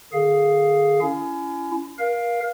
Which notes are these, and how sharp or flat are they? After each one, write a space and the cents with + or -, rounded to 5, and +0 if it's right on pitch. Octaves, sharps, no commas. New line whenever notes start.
D3 +40 G#4 +0 F5 +0
C#4 +20 E4 +40
A#4 +30 F5 +0